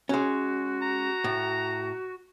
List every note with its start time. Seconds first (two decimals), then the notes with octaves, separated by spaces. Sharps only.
0.09 G#3 C#4 F#4
0.82 A#5
1.24 A2